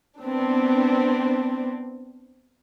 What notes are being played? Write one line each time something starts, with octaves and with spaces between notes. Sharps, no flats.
B3 C4 D4